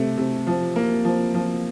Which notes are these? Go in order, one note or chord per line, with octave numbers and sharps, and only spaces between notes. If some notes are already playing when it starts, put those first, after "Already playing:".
Already playing: C3 A3
C3
F3
A#3
F3
F3